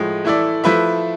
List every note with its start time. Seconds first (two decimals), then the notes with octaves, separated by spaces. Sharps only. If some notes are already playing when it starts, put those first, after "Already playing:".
Already playing: A2 F3 G#3
0.25 E3 A3 E4 A4 D5
0.64 F3 A3 E4 B4 E5